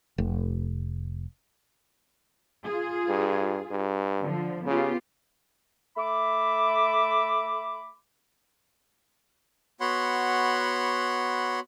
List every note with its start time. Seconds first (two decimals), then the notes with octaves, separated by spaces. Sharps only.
0.18 F1
2.63 F4 G#4
3.09 G2
3.71 G2
4.22 D3 F3
4.66 C#3 B3 F4 G4
5.97 A3 E5 B5 D6
9.81 B3 F#4 C#5 F#5 B5 C6